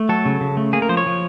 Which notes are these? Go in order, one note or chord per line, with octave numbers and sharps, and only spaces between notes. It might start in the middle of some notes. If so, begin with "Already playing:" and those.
Already playing: A3
F#3 A4
C#3
C#3
A3
A#3 G#4
A#4
F3 C5
C#5
F3